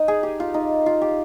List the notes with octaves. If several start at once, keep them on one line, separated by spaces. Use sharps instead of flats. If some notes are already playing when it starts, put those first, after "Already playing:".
Already playing: D#4
G#4
G4
F4
D#4
F4
G4